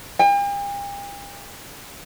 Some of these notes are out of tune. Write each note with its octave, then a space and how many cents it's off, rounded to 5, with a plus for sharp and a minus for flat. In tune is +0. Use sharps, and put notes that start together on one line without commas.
G5 +45